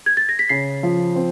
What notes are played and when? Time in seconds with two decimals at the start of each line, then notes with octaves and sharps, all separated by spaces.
0.06 G#6
0.17 A6
0.29 A#6
0.39 B6
0.49 C#3 C7
0.83 F3
1.16 C4